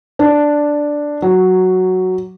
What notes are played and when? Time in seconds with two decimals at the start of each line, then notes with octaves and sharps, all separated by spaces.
0.19 D4
1.22 F#3